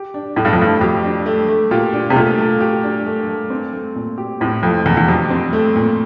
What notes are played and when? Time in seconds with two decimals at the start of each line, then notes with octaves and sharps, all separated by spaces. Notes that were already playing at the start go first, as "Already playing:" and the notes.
Already playing: G4
0.14 D4
0.36 A2 A3
0.45 G2
0.53 F2
0.59 G2 A3
0.81 F2 G4
1.04 D4
1.26 A3
1.48 A3
1.71 A#2 G4
1.93 D4
2.10 C3
2.16 A#2 A3
2.38 A3
2.61 G4
2.83 D4
3.06 A3
3.29 A3
3.50 C4
3.73 A3
3.95 A#2
4.18 G4
4.40 A2 C4
4.63 F2 A3
4.85 E2 A#2
4.97 E2
5.08 F2 G4
5.30 C4
5.53 A3
5.76 A#2